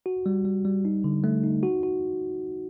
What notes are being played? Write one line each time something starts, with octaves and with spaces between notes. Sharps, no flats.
F#4
G3
G3
G3
D#4
D3
A3
D#4
F#4
F#4